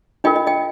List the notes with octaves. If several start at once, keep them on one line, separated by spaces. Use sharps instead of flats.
D4 F4 A#4 D#5 G5
D#5
D#5 G5